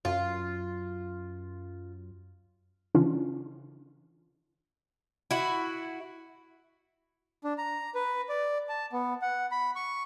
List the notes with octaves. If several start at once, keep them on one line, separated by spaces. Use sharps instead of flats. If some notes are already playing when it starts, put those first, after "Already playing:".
F#2 F4
C#3 E3 C#4 D4 F4
E4 F#4
D4
A#5
B4
D5
A5
B3
F#5
B5
C#6